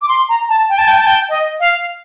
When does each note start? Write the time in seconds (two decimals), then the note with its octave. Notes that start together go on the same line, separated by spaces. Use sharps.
0.02 D6
0.08 C6
0.29 A#5
0.49 A5
0.69 G5
0.78 A5
0.87 G5
0.98 A5
1.07 G5
1.29 D#5
1.60 F5